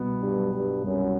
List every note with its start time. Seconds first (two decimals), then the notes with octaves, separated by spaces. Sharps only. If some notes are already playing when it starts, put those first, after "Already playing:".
Already playing: C2 B2 B3
0.21 G2
0.37 F#3
0.53 G2
0.84 C2 F#2